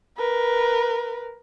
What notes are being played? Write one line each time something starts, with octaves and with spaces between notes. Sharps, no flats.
A#4 B4